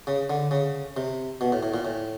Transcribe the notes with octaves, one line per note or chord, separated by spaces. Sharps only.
C#3
D3
C#3
C3
B2
A2
A2
A#2
A2